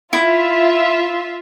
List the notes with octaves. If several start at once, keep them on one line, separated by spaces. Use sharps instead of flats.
E4 F4 E5